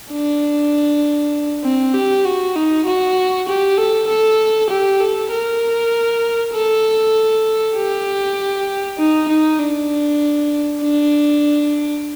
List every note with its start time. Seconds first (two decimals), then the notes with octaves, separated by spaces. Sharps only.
0.12 D4
1.64 C4
1.95 G4
2.25 F#4
2.56 D#4
2.86 F#4
3.48 G4
3.78 A4
4.08 A4
4.70 G4
5.00 A4
5.32 A#4
6.53 A4
7.76 G4
8.98 D#4
9.29 D#4
9.59 D4
10.82 D4